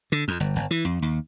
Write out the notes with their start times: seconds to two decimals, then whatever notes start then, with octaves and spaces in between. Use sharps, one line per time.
0.12 D3
0.28 F2
0.40 G1
0.56 G1
0.71 E3
0.85 F2
1.02 D#2